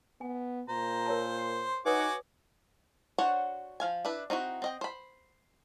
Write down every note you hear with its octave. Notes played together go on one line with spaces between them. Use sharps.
B3 G#5
A#2 C5 A#5
A#4 C#5 A5
C6
D#4 F#4 B4 C#5 F#5 G#5 D6 D#6
D4 F#4 C5 C#5 F#5
F3 F5 G#5
D4 E4 B4
C4 D#4 E4 F#4
C4 D#5 G5
C5 B5